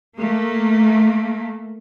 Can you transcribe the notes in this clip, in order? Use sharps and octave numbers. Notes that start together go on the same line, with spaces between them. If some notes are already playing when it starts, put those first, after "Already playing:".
A3 A#3